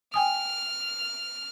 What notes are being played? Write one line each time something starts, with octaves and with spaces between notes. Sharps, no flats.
G5 G#5 D#6 F6